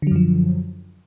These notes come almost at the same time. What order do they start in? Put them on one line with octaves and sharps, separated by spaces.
D3 F#3 F#2 F3